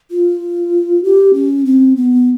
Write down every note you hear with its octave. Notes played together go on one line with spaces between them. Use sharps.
F4
G4
C#4
C4
B3